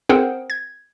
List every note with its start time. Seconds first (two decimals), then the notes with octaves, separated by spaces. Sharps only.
0.09 C4 G#4 A#4 C5 F#5 G5
0.50 G#6